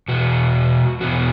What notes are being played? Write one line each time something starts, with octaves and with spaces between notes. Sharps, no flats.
E2 B2 F#4
E2 B2 F#4